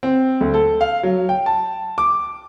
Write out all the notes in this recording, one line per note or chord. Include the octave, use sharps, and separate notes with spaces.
C4
D2
A4
F5
F#3
G5
A5
D6